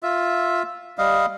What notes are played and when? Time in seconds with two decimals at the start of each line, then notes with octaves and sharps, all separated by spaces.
0.03 F4 E5
0.98 G3 D#5 F5